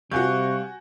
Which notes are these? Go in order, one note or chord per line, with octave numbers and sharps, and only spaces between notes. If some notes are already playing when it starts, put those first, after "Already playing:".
C3 G3 F#4 F5 G#5 C#6 F#6 G6